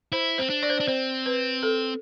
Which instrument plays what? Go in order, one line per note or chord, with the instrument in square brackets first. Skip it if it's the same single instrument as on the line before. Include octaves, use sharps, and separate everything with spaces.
[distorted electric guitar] E4 [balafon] C5
[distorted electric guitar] C4 [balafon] C5
[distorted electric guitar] D4
[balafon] D5
C5
[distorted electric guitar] D4 [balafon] D5
[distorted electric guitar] C4 [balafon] C5
[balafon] B4
A4